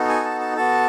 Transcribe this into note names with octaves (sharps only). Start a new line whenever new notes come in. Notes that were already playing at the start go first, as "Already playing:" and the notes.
Already playing: B3 D#4 F#4 A4
G#5
A5
A5
B3 F#4 A4 A5